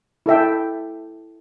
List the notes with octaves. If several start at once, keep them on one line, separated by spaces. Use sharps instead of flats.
E4 A4 E5 G5